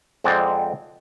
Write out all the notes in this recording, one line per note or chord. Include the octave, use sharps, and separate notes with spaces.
F2 G#3 C4 D5 F#5 G5